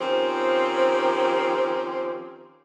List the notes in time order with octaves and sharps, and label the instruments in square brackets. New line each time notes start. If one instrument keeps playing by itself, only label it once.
[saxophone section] D#3 F3 C4 C#4 G4